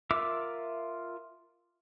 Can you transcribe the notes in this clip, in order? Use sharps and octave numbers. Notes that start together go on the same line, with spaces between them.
F4 A#4 E5 D6 E6